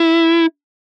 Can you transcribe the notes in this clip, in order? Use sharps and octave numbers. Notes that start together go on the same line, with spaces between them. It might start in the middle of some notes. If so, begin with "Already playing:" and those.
Already playing: E4